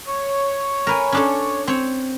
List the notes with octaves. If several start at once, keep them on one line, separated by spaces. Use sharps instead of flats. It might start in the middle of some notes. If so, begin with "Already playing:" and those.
C#5
A#4 B4 G#5
C#4 D4 A4
C4 C#5